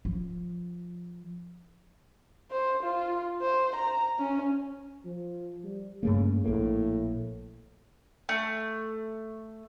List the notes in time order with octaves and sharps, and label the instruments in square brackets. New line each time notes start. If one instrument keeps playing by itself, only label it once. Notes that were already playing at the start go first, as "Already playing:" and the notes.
[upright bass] F3
[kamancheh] C5
F4
C5
A#5
C#4
[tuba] F3
G3
[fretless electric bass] G2 A3 A#3 [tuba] C#3
[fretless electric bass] A#1 A#3 [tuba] A2
[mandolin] A3